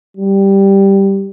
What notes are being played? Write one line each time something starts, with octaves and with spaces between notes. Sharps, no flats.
G3